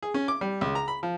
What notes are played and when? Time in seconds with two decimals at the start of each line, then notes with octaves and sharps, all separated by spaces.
0.03 G#4
0.14 C#4
0.28 D6
0.41 G3
0.61 C#2
0.75 A#5
0.88 B5
1.03 F3